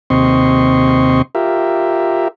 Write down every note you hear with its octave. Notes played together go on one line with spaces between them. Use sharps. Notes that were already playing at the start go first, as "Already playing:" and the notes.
D#2 C3 C4 D#5 C6 C#6
F4 G4 A#4 E5